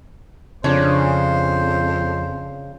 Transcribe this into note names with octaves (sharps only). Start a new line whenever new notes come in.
F2 C#3 D4 C5 C#5